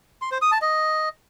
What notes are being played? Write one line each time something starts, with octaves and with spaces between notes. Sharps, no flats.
C6
C5
D#6
A5
D#5